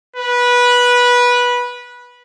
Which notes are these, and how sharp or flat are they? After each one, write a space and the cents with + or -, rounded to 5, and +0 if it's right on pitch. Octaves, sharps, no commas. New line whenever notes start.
B4 -15